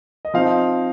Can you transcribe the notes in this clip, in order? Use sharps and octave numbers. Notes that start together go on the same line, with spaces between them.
D#5
F3 C4 D#4 F5